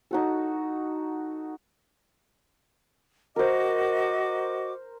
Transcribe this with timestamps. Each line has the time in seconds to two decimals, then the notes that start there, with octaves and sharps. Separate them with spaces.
0.11 D#4 F#4 A4
3.36 F#4 A#4 C5 D#5 D6